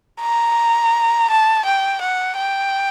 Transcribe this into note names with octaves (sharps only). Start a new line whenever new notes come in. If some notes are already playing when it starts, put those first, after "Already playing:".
A#5
A5
G5
F#5
G5